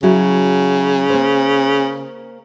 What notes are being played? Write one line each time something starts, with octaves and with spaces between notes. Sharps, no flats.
C#3 F#3 E4 F#4
A#3 C5